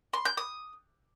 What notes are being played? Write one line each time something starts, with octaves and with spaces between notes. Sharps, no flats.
C6
G6
D#6